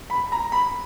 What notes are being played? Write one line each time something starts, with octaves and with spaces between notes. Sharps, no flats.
B5
A#5
B5